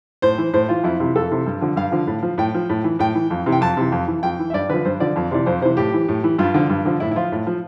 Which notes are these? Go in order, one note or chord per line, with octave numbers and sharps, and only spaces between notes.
A2 C5
E3
A2 C5
E3 F4
F2 E4
C3 E3 E4
F2 A4
C3 E3
G2
D3 F3
G2 F5
D3 F3
A2
F3
A2 G5
F3
A2
E3
A2 G5
E3
F2
C3 E3
G5
F2 A5
C3 E3
F2
E3
F2 G5
E3
E5
G2 D5
D3 F3 B4
G2 C5
D3 F3 D5
F2
C3 E3 D5
F2 C5
C3 E3 C5
A2 G4
E3
A2
E3
G2 F4
D3 F3
G2
D3 F3
A2 E4
E4
F3 F4
A2
F3